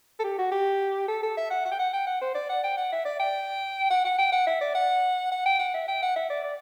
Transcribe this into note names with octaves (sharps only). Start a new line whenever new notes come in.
A4
G4
F#4
G4
A4
A4
E5
F#5
F#5
G5
F#5
G5
F#5
C5
D5
F#5
G5
F#5
E5
D5
G5
F#5
F#5
G5
F#5
E5
D5
F#5
F#5
G5
F#5
E5
G5
F#5
E5
D5
D5